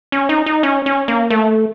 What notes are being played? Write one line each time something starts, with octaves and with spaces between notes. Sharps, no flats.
C#4
D#4
D#4
C#4
C#4
A#3
A3